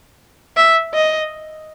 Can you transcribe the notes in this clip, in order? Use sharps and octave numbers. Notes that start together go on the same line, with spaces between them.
E5
D#5